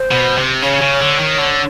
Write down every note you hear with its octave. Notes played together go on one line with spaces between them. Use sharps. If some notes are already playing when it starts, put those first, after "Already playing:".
Already playing: C5
B2
C3
C#3 C#5
C#3
D3
D#3
D3